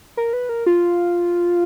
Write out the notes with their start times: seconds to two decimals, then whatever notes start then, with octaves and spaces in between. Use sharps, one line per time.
0.17 A#4
0.33 B4
0.49 A#4
0.66 F4